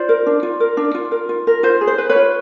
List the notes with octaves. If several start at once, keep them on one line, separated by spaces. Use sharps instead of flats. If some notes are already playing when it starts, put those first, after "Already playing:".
Already playing: F4 C5 D5
A#4
D4
F4
A#4
D4
F4
A#4
F4
A#4
F4 C5
G#4
C5
B4
B4 C#5
F4